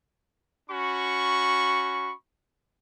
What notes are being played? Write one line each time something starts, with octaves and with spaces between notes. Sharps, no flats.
C#4 F#4 B5 C#6